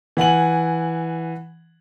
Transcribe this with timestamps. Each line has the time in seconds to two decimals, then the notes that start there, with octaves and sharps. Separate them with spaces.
0.17 E3 F#5 G#5 F#7